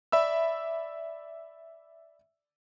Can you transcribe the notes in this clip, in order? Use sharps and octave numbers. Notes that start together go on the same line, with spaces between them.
D5 E5 B5 E6